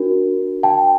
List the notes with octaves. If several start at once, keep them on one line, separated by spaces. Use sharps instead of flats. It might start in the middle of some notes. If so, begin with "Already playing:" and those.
Already playing: D4 F#4 A#4
G5 A5